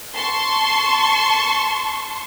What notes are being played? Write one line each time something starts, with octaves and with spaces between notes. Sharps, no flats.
A5 C6 C#6